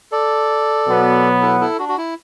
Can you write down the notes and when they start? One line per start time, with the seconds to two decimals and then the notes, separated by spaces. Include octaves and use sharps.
0.12 A4 D5
0.86 B2 F#3 B3
1.41 E4 A4
1.61 E4 A4
1.79 D4 F#4
1.89 F#4
1.98 E4